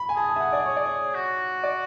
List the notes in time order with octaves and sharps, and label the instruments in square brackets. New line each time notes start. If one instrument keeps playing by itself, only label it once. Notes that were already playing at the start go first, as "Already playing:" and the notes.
Already playing: [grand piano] B5
G#5
[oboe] G#4 [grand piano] A5
[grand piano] A5
E5
F#5
D5
C#5
D5
C#5
[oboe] F#4
[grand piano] D5